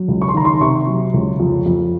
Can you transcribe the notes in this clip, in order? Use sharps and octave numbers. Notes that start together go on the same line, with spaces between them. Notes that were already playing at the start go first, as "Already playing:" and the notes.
Already playing: F#3
C#2
C#6
C6
D#3 A#5
C6
C3 C#6
F#3
C#2
F2
F2